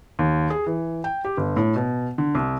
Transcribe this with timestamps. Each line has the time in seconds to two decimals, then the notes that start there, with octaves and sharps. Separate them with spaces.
0.19 D#2
0.50 G#4
0.67 E3
1.04 G5
1.24 G4
1.37 G1
1.57 A2
1.76 B2
2.18 D3
2.35 C2